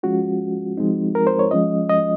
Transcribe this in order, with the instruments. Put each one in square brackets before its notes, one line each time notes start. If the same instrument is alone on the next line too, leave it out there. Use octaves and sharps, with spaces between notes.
[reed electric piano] F3 G#3 C#4 F4 F#4
F3 G#3 C4 D#4
A#4
C5
C#5
F3 G#3 C#4 F4 D#5
D#5